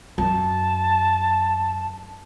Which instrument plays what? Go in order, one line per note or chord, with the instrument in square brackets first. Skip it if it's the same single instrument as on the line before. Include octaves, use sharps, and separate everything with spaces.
[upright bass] F#2 [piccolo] A5